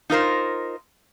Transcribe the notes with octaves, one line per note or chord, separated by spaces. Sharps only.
D#4 F4 A#4 C5